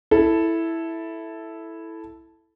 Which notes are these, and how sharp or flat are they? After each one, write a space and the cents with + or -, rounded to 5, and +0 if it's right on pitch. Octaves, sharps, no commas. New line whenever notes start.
E4 +0 A4 +0